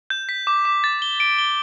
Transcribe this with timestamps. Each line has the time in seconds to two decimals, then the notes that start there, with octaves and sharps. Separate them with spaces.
0.10 G6
0.29 B6
0.47 D6
0.65 D6
0.84 A6
1.02 G7
1.20 D7
1.38 G7